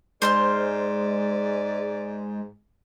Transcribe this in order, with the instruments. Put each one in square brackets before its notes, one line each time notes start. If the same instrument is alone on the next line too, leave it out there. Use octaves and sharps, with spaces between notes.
[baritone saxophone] G#2 [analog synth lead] G#3 [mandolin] C5 C6 F6 [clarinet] D5